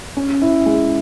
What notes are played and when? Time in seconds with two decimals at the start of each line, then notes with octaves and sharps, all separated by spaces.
0.17 C#4
0.42 E4
0.66 G#3